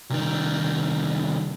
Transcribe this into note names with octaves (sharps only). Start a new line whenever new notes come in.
C2 D#3